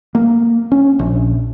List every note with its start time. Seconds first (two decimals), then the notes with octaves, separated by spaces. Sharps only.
0.15 A#3
0.72 C#4
0.99 A#1